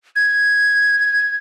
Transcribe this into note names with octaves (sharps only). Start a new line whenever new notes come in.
G#6